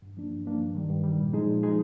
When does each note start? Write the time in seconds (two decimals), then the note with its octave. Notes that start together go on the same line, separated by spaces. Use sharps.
0.02 G2
0.17 F3 A#3 D4
0.32 G2
0.45 F3 A#3 D4
0.61 G2
0.75 D#3 G3
0.90 G2
1.04 D#3 G3
1.19 A#2
1.33 F3 G#3 D#4 G#4
1.47 A#2
1.63 F3 G#3 D#4 G#4